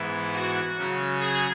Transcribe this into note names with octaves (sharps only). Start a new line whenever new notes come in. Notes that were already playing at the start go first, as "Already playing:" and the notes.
Already playing: G#2 E3 B3 E4
F#4
C#3 F#3 C#4
G#4